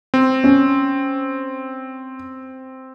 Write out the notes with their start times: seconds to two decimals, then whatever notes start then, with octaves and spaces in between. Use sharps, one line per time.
0.14 C4
0.44 C#4